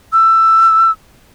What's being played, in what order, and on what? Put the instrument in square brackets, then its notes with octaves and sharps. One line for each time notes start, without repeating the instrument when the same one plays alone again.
[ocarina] E6